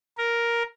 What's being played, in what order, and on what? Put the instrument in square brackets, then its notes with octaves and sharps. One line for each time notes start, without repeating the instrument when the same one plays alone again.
[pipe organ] A#4